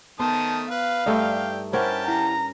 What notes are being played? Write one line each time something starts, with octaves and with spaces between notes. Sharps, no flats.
D#3 A3 B3 C5 A5 D#6
B4 F5
G2 A3 D#4 G4 D5 E6
C#4 E4 G4 A#4 C5 F#5 A5
E4 F#5 A#5